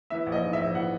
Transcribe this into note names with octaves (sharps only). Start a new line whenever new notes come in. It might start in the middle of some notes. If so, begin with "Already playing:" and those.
E3 E5
A#1
D#5
G#2
E5
A#1
E3 F#5